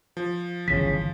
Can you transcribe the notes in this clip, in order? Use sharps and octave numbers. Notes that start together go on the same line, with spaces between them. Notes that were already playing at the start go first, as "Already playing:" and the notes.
F3
G1 C#3 E3 B6